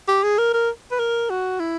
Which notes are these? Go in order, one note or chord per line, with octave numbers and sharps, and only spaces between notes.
G4
G#4
A#4
A#4
B4
A#4
F#4
E4